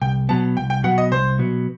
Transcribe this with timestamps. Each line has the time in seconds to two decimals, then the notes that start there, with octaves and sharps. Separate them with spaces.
0.02 C2 G5
0.29 B2 F#3 B3 A5
0.56 C2 G5
0.70 G5
0.84 B2 F#3 B3 F#5
0.98 D#5
1.11 C2 C5
1.39 B2 F#3 B3